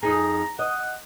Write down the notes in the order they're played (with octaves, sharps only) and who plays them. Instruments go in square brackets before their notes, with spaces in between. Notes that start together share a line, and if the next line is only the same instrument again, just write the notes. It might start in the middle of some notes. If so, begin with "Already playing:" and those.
[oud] F2 D#4 G#4 [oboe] A#5
[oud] D#5 [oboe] F#5